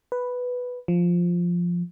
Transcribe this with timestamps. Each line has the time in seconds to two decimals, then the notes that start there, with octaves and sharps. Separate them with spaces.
0.12 B4
0.88 F3